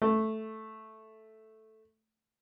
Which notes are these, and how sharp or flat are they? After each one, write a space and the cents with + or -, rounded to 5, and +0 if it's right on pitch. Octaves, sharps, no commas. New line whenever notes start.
A3 -5